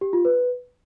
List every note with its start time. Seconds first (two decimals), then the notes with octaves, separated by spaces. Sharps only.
0.01 G4
0.13 F4
0.25 B4